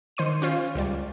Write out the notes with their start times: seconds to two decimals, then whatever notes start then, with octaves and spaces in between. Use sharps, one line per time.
0.17 D#3 C5 C6 C#7 D#7
0.42 C#4 F4 C5
0.75 C#2 G3 D5